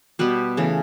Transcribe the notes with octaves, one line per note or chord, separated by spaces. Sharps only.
B2 G3 B3 G4 B4
C#3 E3 A3